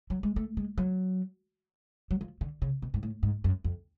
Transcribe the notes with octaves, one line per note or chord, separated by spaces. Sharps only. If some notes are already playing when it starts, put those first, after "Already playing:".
F#3
G#3
A3
G#3
F#3
F#3
F3
D3
C#3
B2
G#2
A2
G#2
F#2
F2